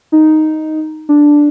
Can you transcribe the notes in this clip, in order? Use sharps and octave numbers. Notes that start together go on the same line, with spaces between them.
D#4
D4